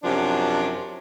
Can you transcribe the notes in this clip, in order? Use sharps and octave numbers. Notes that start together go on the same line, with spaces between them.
F#2 C3 F3 C#4 D4